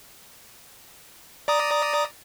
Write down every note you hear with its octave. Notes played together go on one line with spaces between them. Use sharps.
D5 A#5 D#6